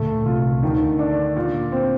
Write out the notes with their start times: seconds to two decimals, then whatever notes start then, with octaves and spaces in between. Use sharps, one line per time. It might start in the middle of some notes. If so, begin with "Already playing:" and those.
Already playing: D2 A#2 D3 A3
0.26 C2 C3 F4
0.62 D2 D3 D#3
0.99 D4
1.37 A#2
1.72 C4